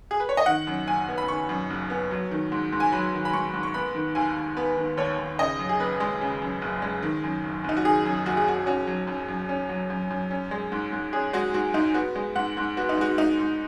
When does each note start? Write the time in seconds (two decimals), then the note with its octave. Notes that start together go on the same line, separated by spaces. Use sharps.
0.11 G#4
0.20 B4
0.29 C#5
0.37 D#5
0.46 D#3 F#5
0.67 F#2
0.87 F#1 G#5
1.09 B3
1.18 B5
1.28 D#3 C#6
1.49 F#2
1.70 F#1
1.90 B3
2.11 F#3
2.31 D#3
2.52 G#2
2.72 G#2
2.80 G#5
2.92 F#3 B5
3.13 D#3
3.25 B5
3.33 G#2 C#6
3.54 G#2
3.63 C#6
3.74 B3 B5
3.95 D#3
4.15 D#2 G#5
4.36 D#2
4.57 B3 B4
4.77 D#3
4.97 D#2 C#5
5.18 D#2
5.38 C#3 D#5
5.59 F#2
5.69 G#4
5.80 F#1 B4
6.00 G#3
6.21 C#3
6.42 F#2
6.62 F#1
6.82 G#3
7.02 D#3
7.24 F#2
7.44 F#1
7.64 F#1 D#4
7.77 F#4
7.85 D#3 G#4
8.05 F#2
8.26 F#1 F#4
8.37 G#4
8.46 F#1 F#4
8.66 C#4 F#4
8.87 F#3
9.07 F#2
9.28 F#2
9.49 C#4
9.69 F#3
9.90 F#2
10.10 F#2
10.31 C#4
10.51 G#3
10.72 G#2
10.93 G#2
11.13 C#4 G#4
11.33 G#3 F#4
11.54 G#2 F#4
11.74 G#2 D#4
11.94 B3 F#4
12.16 G#3
12.36 G#2 F#5
12.57 G#2
12.77 B3 F#4
12.89 D#4
12.97 G#3 F#4
13.18 G#2 D#4
13.38 G#2